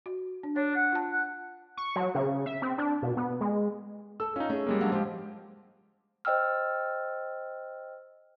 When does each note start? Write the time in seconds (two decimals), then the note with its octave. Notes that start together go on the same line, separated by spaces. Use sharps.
0.06 F#4
0.43 D4
0.56 D4 C#5
0.76 F#5
0.92 F4 A5
1.12 F#5
1.77 C#6
1.96 F#3
2.15 C#3
2.46 E5
2.62 C4
2.78 D4
3.03 B2
3.17 B3
3.41 G#3
4.20 A4 A5 E6
4.36 C#4 D#4 F4
4.50 A3 C#4 G#4
4.67 G3 G#3 A#3
4.79 C#3 F#3 D4
4.92 F3 G#3 G4 F5
6.25 C5 D#5 G5 E6 F6